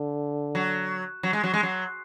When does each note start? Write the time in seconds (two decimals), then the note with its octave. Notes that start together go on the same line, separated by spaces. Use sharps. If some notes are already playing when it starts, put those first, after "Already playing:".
Already playing: D3
0.55 F#3
1.23 F#3
1.33 G#3
1.44 F#3
1.53 G#3
1.63 F#3